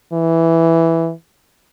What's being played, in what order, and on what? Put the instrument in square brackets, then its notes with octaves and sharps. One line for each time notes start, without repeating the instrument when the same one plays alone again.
[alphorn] E3